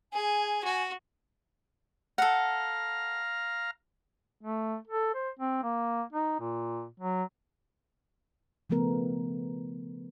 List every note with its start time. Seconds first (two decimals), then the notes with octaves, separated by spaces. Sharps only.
0.13 G#4 G#5
0.64 F#4
2.18 A4 F5 F#5 A#5 F6
4.42 A3
4.87 A4
5.14 C5
5.39 C4
5.63 A#3
6.12 D#4
6.39 A#2
7.00 F#3
8.70 C#3 F3 A3 B3 A#4